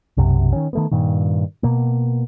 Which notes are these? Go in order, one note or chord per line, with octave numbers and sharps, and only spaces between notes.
B1 F#2 C3
D#3 C#4
D#3 A3 B3
G2 A#2 D#3
B2 A#3